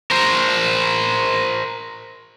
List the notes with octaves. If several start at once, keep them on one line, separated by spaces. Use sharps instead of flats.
A#4 C5